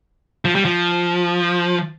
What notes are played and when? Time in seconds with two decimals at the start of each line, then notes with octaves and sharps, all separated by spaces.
0.45 F3
0.55 G3
0.65 F3